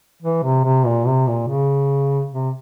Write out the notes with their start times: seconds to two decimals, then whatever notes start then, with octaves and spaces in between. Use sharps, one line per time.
0.22 E3
0.43 C3
0.64 C3
0.85 A#2
1.06 C3
1.27 A#2
1.48 C#3
2.31 C3